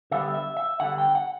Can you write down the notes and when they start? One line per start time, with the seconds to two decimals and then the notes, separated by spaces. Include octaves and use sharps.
0.11 D3 G3 B3 E5
0.34 E5
0.57 E5
0.80 D3 G3 B3 F#5
0.98 G5
1.15 F#5